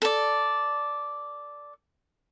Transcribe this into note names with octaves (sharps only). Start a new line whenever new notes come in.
A4 D5